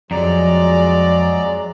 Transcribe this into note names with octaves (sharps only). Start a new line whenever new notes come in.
F2 F#3 G#3 D5 A#5